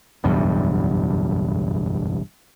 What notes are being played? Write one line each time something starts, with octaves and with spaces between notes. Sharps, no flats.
F#1 B1 E2 G2